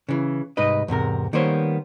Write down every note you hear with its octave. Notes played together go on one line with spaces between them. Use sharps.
C#3 E3
C2 G#2 D#4 B4 D#5
E2 G#2 C3 A#4
D#3 G3 A#3 B3 C5 C#5